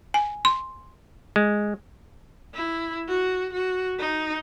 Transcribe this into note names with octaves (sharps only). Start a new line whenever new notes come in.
G#5
C6
G#3
E4
F#4
F#4
D#4